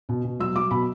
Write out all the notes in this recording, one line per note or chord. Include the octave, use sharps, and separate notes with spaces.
B2
B2
F#3 E6
F#3 D6
B2 B5